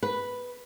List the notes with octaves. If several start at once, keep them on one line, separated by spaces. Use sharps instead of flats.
B4